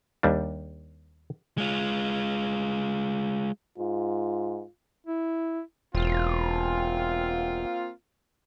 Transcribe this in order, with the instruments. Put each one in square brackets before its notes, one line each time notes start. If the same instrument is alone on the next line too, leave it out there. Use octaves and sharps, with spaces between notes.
[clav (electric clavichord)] D#2 G3 D4
[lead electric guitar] G#3 F4
[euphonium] G#2 [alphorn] F4
[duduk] E4
[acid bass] E1 [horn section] A#3 C4 F4